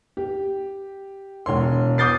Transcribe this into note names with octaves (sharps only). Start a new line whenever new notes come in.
G4
E1 C#5 C6
D6 D#6 G6 A6 C7